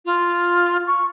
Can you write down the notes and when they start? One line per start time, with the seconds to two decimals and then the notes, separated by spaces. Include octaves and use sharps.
0.06 F4
0.87 C#6